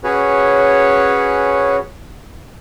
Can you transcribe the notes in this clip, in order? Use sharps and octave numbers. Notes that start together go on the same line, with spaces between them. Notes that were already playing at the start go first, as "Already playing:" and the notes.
C#4 F#4 G#4 B4 C#5